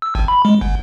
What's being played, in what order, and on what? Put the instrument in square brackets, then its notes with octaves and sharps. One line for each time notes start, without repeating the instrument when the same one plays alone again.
[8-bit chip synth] E6
G#1
B5
G#3
G1